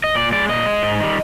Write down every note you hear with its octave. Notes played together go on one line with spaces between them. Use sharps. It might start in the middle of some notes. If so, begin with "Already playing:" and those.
D#5
A#2 D5
G#3 D5
A#2 D#5
G#3
G#2
D#3 G3